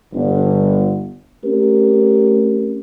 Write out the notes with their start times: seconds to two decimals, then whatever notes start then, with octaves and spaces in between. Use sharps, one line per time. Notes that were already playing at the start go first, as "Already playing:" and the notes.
0.14 G1
1.45 A3 C4 C#4 G4 A#4